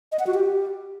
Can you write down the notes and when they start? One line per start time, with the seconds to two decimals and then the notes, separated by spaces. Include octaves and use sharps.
0.12 D#5
0.19 F#5
0.27 F#4
0.34 G4